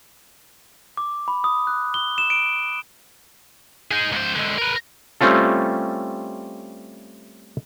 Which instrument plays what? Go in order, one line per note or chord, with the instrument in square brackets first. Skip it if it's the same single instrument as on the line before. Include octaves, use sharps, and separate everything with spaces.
[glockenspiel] D6
B5
D#6
F#6
G7
E7
D7
[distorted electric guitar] D#4 G#4
C#2 C5
G#2 D3
A#4 B4
[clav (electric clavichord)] G3 A3 C4 C#4 F4 A4